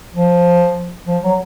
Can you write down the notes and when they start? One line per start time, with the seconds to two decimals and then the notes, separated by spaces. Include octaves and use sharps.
0.13 F3
1.07 F3
1.23 F#3